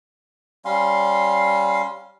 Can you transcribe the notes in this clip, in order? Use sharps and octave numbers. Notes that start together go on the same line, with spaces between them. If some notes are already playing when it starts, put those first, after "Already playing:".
G3 C#4 F5 C6